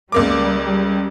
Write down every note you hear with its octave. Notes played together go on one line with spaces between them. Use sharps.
C#2 G3 A#3 D6